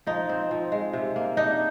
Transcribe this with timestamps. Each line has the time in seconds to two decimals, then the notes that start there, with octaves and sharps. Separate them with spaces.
0.06 F3 D#4
0.29 C4
0.51 F3
0.72 G#3
0.93 C3
1.16 A#3
1.37 D4 D#4